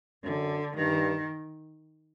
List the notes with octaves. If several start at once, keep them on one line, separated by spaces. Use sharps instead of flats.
F#2 D3
G2 D#3